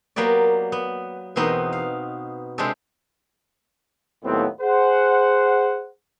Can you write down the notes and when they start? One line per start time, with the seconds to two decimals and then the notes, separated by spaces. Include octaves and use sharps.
0.16 F#3 A#3 B3 G4 D5
0.72 B3
1.36 E2 B2 B3 C4 D#4 D#5
1.73 F5
2.58 C3 G#3 C4 D4 G4 A4
4.25 D#2 A2 F#3 B3 C4
4.61 G#4 C5 F#5